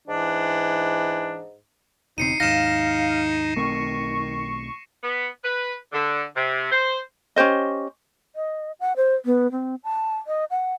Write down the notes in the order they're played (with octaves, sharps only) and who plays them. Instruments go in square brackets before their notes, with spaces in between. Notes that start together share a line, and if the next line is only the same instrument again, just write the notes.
[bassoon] G#2 [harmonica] E3 D4
[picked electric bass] E1 C#3 C4 [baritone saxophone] D#4 [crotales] C7 C#7 D#7
[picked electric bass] D#2 G#2 [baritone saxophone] D#4 [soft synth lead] F5 [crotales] A#6 E7
[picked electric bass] B1 A3 C4 [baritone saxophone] D#3 [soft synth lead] C#6
[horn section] B3
B4
D3
C3
C5
[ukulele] C#4 G4 C5 D#5
[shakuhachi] D#5
F#5
C5
B3
C4
A5
D#5
F#5